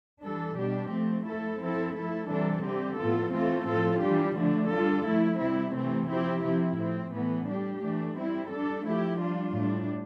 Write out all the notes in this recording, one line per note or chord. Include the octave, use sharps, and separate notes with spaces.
E3 G3 D4 A4
B2 G3 D4 G4
F3 A3 C4
F3 A3 E4 A4
F3 C4 E4 A4
F3 A3 E4 A4
C3 E3 G3 D4 A4
D3 G3 C4 G4
A2 F3 B3 F4 A4
E3 A3 C4 F4 A4
A2 F3 C4 F4 A4
E3 G3 D4 G4
D3 F3 A3 D4
G3 D4 F4 A4
F3 A3 E4
C3 G3 C4 E4
C3 E3 A3 C4
F3 C4 E4 G4
C3 F3 C4 E4
A2 F3 C4
A2 E3 B3
G3 D4 G4
E3 A3 D4
G3 C4 E4
G3 D4 A4
F3 A3 E4 G4
G3 D4 F4
A2 G3 D4